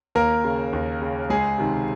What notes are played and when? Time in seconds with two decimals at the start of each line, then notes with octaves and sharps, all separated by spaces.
0.15 D#2 A#3 A#4
0.44 C#3
0.73 D#2
1.02 C#3
1.29 C#2 G#3 G#4
1.58 C3 D#3